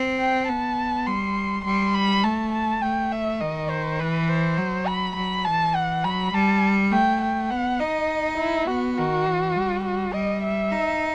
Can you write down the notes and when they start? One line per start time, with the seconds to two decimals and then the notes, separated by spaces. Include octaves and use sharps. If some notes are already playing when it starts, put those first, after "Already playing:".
Already playing: C4
0.19 G5
0.48 B3 A5
1.06 G3 C6
1.65 G3 C6
1.94 B5
2.24 A3 A5
2.53 A5
2.82 A3 G5
3.12 E5
3.41 D#3 D#5
3.70 C5
3.99 E3 B4
4.28 C5
4.57 F#3
4.87 B5
5.16 F#3 B5
5.45 E3 A5
5.75 F#5
6.04 F#3 B5
6.33 G3 A5
6.92 A3 G5
7.22 G5
7.50 B3 F#5
7.79 D#4 D#5
8.38 E4
8.67 B3 F#4
8.97 D#3 F#4
9.26 E3
9.55 G3
9.84 F#4
10.13 G3 D#5
10.43 E5
10.72 D#4